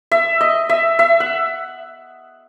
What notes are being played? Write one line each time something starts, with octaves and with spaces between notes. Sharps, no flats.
E5
D#5
E5
E5
F#5